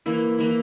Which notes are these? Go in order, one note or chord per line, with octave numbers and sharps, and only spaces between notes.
E3 A#3 E4
E3 A#3 E4